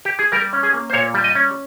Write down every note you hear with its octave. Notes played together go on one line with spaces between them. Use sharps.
G4
G#4
G3 A#4
C#4
G#4
A#3
C5
A#2 C#5
G3
D#5
C#4